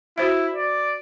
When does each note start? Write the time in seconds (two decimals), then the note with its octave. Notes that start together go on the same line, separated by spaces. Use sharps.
0.18 E4 F#4 C5 E5
0.54 D5